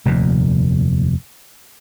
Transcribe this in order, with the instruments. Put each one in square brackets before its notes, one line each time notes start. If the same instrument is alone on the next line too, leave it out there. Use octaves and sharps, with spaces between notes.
[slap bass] F1 D#2 A#2